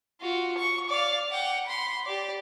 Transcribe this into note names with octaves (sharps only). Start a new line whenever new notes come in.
F4 F#4
C#6
D5 F5
F#5 G5
B5 C6
G4 D5